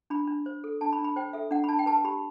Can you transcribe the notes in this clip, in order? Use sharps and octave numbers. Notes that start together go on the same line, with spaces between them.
D4 B5
D4
C5
A4
D4 A5
B5
D4
B5
C5 G5
A4 E5
D4 F#5
B5
D4 A5
G5
B4 A5
G4 B5